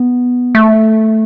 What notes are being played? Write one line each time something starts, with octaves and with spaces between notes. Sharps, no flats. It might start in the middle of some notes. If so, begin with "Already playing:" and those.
Already playing: B3
A3